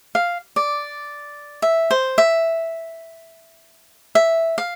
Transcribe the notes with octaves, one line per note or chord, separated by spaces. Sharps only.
F5
D5
E5
C5
E5
E5
F5